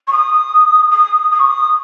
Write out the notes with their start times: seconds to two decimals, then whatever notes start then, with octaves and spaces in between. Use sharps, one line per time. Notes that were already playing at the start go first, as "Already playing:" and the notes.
0.07 C#6
0.12 D#6
0.91 D#6
1.31 D#6
1.39 C#6
1.46 D#6